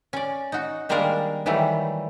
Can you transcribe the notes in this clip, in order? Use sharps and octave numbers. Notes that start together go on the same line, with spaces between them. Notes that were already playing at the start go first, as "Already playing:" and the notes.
C#4 D5
D#4 F#4
D#3 G3 G#3 A#3 D4 A#4
D#3 E3 F#3 G3 A3